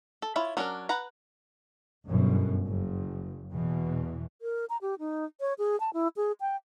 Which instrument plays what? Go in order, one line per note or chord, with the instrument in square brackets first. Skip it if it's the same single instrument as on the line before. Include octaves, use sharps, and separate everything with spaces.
[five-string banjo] A4
E4 F4 C#5
F#3 C#4 D4 G#4 A#4
B4 F#5 A#5
[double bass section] G1 F#2 B2
F#1
E2 B2 E3
[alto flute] A#4
A#5
G4
D#4
C#5
G#4
A5
E4
G#4
G5